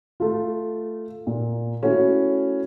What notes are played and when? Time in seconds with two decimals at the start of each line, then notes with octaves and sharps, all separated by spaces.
0.20 A3 F4
1.27 A#2
1.82 A3 C#4 E4 F#4